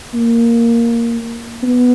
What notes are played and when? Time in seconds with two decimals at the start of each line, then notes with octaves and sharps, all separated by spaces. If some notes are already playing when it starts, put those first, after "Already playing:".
0.14 A#3
1.63 B3